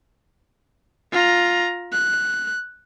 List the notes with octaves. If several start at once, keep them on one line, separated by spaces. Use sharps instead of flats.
F4 A#5
F#6